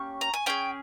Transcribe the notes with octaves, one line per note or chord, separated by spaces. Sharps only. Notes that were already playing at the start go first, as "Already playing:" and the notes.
Already playing: A#3 C#4 G4 C#6
A#5
G#5
C#4 G#4 G5